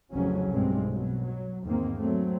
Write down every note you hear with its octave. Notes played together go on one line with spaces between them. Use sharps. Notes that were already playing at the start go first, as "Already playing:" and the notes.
A1 F2 C#3 F#3 C#4
B1 G2 B2 G#3 C4
B2 F#3
F#3
E2 G#2 D#3 A#3 C4
F#3 A3 C4